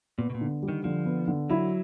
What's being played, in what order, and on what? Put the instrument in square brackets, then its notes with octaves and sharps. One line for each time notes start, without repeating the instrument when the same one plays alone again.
[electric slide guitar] A#2 [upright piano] B3
[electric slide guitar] B2
A#2
[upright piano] D3
G3
[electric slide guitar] D#3
[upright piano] D3 [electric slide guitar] F3
[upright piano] B3
D3
[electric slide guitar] F#3 [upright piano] E4